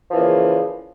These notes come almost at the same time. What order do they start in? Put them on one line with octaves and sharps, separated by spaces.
F3 E3 A#2 C#3